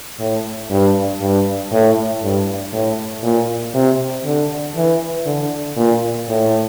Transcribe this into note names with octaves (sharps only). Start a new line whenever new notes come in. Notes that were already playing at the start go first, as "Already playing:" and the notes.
A2
G2
G2
A2
G2
A2
A#2
C3
D3
E3
D3
A#2
A2